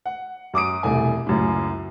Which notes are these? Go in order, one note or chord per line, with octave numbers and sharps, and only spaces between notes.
F#5
F#2 D6 D#6 D7
E1 C2 A3 G#5
C#2 F#2 A2